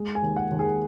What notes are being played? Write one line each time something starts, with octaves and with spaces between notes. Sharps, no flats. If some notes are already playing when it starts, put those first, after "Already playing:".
Already playing: G#3
G#5
D#2
F#5
D#2
G#4